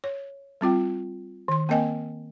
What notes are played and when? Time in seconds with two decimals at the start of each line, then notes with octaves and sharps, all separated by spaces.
0.04 C#5
0.61 G3 C4 F4 G5
1.48 D#3 C6
1.69 A#3 C4 A#4 D#5 G5 G#5